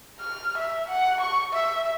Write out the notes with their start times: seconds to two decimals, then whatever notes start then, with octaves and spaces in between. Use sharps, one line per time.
0.20 F6
0.57 E5
0.89 F#5
1.20 C#6
1.53 E5